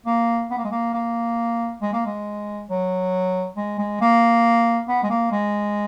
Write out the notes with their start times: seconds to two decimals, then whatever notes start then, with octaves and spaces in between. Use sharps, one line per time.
0.06 A#3
0.51 B3
0.58 A#3
0.65 G#3
0.71 A#3
0.94 A#3
1.82 G#3
1.93 A#3
2.06 G#3
2.69 F#3
3.57 G#3
3.78 G#3
4.01 A#3
4.88 B3
5.03 G#3
5.10 A#3
5.31 G#3